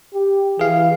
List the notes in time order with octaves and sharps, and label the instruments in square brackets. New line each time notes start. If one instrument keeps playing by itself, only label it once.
[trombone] G4
[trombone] E3 [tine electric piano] G#4 F5